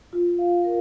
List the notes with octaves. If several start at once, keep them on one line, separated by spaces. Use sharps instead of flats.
F4
F5
A#4